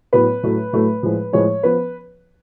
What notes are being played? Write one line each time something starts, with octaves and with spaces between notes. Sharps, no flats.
A2 F#3 B3 B4
A2 F#3 A3
A2 F#3 A3
A2 F3 G#3
A2 F3 G#3 C#5
F3 B3 B4